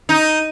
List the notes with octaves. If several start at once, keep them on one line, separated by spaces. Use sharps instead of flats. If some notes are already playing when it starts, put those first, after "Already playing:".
D#4